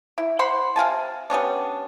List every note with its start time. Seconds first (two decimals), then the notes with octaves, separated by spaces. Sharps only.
0.18 E4
0.39 C5 F#5 B5 C6
0.76 C3 F5 G#5 A5
1.30 G3 B3 C#4 D4